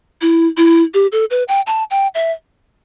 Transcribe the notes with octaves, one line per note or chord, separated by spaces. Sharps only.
E4
E4
G4
A4
B4
G5
A5
G5
E5